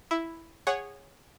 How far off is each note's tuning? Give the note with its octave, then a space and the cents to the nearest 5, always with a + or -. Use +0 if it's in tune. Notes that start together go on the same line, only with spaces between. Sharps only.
E4 +0 E5 +0
G#4 -20 C#5 -5 F#5 +0